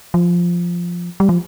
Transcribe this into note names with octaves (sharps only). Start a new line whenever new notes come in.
F3
G3
F3